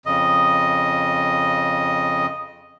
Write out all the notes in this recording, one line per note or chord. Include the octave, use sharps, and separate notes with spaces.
F2 C#3 D#5